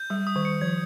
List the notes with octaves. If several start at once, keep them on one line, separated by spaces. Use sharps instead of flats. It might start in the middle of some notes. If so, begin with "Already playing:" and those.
Already playing: G6
G3 D#6
D#6
D#3
C#7
F3 G#6